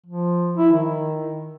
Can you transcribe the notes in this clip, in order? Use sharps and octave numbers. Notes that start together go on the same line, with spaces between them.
F3
E4
D#3